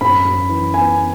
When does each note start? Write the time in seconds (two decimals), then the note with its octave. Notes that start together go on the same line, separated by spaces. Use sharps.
0.01 F#2 B5
0.25 F#2
0.49 E3
0.74 B3 G#5
0.98 B3